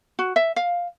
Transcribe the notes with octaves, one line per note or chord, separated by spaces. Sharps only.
F#4
E5
F5